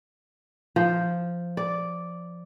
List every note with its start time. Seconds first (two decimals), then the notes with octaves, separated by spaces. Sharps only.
0.76 F3
1.57 D5